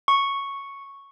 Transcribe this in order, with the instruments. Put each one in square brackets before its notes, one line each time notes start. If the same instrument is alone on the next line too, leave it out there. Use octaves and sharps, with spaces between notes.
[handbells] C#6